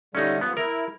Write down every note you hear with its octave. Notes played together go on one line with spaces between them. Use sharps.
D3 G3 A3 C#4 D#4
F3 B3
E4 A#4